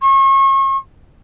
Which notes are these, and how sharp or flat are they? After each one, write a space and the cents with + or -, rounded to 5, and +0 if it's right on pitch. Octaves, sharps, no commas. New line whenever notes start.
C#6 -40